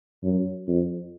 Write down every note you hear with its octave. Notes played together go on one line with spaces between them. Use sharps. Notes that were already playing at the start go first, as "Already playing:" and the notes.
F#2
F2